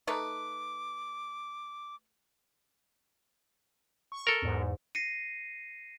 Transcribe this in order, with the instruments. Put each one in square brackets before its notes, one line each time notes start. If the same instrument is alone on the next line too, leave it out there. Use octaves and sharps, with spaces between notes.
[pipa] A3 D#4 B4 [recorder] D6
[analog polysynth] C#6
[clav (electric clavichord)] A4 A#4
[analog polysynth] E2 G#2
[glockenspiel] A#6 C7 C#7 D#7